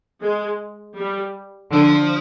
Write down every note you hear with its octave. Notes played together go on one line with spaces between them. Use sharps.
G#3
G3
D3 F3